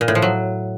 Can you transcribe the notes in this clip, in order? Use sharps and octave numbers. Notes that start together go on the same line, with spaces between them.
A#2
A2
F3
F#3